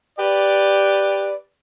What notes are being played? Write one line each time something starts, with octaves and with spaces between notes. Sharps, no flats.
G4 B4 D5